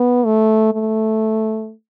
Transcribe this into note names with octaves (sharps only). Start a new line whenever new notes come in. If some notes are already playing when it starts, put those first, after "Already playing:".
Already playing: B3
A3
A3